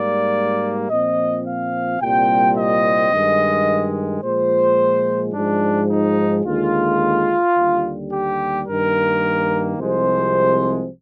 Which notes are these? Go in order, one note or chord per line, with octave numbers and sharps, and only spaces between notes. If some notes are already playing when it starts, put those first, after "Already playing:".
Already playing: G#2 G3 A#3 D5
A#2 F3 C4 D#5
F5
C2 A#2 G3 C4 G5
D#5
G2 D#3 G#3
A#2 F3 G#3 C5
G#2 F3 G#3 D4
D#4
D#2 D3 G#3 F4
D#2 D3 G3
G4
G2 D#3 A#3 A#4
C2 C3 F3 G#3 C4 C5